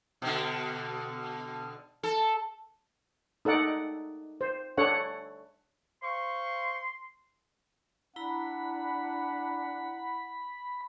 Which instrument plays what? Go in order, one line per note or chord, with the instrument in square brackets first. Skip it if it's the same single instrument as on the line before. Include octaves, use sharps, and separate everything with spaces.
[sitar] B2 D3
A4
[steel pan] D#4 A4 D5 F#5
C5
D4 A4 C#5 F#5
[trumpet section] C5 F5 C#6 [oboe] C6
[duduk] D4 [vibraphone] E4 A#5 [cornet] F#5 [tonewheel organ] B5